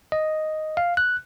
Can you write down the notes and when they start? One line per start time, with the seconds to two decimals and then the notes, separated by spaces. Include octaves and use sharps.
0.12 D#5
0.77 F5
0.97 F#6